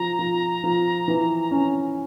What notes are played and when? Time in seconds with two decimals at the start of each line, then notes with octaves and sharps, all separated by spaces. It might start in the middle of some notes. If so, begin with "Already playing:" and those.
Already playing: F3 A#5
0.19 F3
0.64 F3
1.08 E3
1.51 C#4